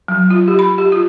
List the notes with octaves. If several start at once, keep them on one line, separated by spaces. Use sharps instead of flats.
F#3
F4
G4
B5
G4
F4